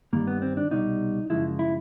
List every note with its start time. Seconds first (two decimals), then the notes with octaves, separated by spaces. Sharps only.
0.13 G2 D#3 G3 A#3
0.27 B3
0.42 C4
0.57 D4
0.71 C2 B2 G3 D#4
1.30 F#2 C#3 F3 G#3 E4
1.59 E4